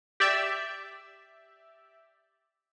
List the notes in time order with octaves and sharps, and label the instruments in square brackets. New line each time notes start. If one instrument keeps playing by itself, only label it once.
[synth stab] G4 D5 E5